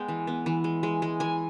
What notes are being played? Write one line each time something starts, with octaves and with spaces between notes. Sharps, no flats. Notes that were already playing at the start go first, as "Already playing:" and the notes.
Already playing: G#3 B3 G5
E3
B3
E3
G#3
G#3
G#3
E3 G#5